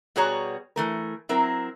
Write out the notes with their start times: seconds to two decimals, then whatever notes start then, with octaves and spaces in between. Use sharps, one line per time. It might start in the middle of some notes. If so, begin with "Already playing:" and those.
0.16 B2 G3 F#4 G#4 C#5 A#5
0.76 E3 A3 A#4
1.29 F#3 C4 E4 A#4